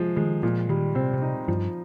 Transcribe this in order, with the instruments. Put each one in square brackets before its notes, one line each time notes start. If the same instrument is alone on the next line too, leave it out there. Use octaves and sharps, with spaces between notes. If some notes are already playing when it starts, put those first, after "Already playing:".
Already playing: [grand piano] C3 F3 G#3
[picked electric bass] D#3 [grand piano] G#3
[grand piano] A#2 [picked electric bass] F3
[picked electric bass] D#3 [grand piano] G3
[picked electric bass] C3 [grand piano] C4
[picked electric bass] C3
[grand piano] D#4
[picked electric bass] G2 [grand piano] F3